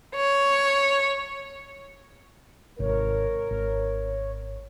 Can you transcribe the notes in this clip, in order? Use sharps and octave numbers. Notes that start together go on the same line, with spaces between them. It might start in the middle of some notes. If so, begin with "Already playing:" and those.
C#5
G#1 C3 A#4 C#5
G#1